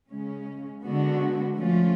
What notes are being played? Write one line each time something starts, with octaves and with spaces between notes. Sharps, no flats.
C#3 G#3 C#4
D3 G#3 B3 F#4
F3 A3 C#4 F4